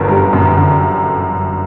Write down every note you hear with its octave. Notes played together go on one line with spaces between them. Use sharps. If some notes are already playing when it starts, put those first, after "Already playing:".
Already playing: G1 F#2 D3 A#4
G3
F#2
D3